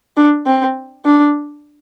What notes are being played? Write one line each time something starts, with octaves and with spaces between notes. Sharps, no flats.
D4
C4
D4